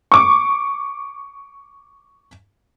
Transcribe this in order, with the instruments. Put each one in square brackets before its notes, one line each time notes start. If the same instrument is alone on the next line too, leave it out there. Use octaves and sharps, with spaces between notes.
[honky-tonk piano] C#6 D6